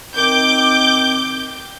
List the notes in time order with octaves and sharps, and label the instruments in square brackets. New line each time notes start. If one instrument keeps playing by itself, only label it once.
[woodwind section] D#3 C4 [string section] D6 G6